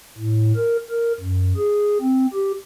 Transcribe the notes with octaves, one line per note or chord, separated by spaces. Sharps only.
A2
A#4
A#4
F#2
G#4
C4
G4